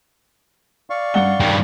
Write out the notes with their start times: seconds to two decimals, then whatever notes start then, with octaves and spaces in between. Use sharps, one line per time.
0.90 D5 F5 C#6
1.14 G2 F#5 G7
1.40 G2 D#3 G5